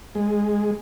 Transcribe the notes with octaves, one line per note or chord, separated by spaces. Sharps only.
G#3